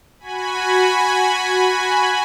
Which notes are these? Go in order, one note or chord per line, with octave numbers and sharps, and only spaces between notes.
F#4 G#5 B5